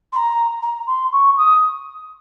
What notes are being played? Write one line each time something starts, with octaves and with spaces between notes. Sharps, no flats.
C6
A#5
A#5
C6
C#6
D#6